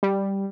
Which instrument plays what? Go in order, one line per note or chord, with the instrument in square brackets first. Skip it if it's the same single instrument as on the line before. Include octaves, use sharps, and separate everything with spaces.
[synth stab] G3